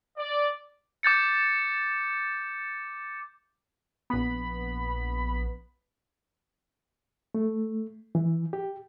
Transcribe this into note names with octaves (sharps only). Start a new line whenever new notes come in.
D5
D6 G6 A6 C#7
A#1 B3 B5
A3
E3
G4